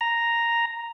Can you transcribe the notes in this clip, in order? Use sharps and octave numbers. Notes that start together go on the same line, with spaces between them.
A#5